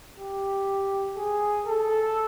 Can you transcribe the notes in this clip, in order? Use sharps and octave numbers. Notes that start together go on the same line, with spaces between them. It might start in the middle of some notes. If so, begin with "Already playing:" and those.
G4
G#4
A4